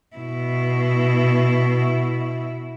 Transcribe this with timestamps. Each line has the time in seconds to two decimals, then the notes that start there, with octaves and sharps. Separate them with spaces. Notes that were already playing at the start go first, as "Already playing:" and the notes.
0.16 B2 E4